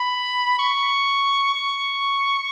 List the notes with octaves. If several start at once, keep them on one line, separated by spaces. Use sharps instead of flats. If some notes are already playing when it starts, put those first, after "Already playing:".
Already playing: B5
C#6
C#6